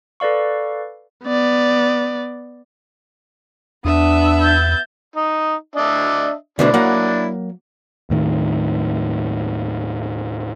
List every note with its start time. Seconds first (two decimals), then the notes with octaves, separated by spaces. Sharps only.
0.20 A4 B4 D5 F5 C#6
1.25 B3 D5
3.85 E2 B3 D4 E5 D#6
4.41 G6 A6
5.16 D#4
5.76 D4 D#5 E5
6.59 D2 B2 D3 D4 E4
6.74 F#3 A#3 F#5
8.10 D#2 A2 D#3